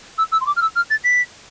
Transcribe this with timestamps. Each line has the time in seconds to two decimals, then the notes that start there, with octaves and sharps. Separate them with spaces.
0.18 E6
0.32 E6
0.41 C6
0.46 D6
0.56 F6
0.61 E6
0.75 F6
0.90 A6
1.04 B6